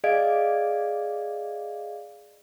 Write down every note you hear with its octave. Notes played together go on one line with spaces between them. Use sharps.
G#4 D5 D#5 F5 G#6 D7